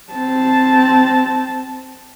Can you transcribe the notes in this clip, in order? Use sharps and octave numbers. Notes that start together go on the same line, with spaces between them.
C4 A5